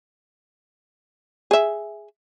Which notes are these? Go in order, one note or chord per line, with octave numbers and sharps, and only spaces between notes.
G#4 E5